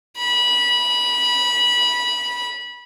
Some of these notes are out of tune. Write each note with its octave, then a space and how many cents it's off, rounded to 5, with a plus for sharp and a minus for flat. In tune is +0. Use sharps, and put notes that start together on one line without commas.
B5 -20